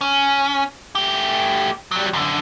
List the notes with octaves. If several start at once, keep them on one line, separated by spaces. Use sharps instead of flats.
C#4
A3 G4
F#3 G3
F#2 D3